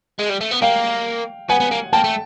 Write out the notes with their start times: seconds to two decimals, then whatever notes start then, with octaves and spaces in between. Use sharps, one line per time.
0.19 G#3
0.29 G3
0.41 A3
0.51 B3
0.62 A#3 F5 G5
1.49 B3 F#5 G#5
1.60 B3
1.71 A#3
1.93 A#3 G5 A5
2.04 A3